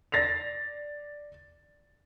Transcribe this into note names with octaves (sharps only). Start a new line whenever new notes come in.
D5 A6 A#6 C7 F7